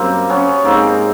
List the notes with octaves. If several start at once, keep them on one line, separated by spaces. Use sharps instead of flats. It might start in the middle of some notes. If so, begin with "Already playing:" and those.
Already playing: F#2 G3 A#3 C4
B3 C#4
G#2 A#3 C4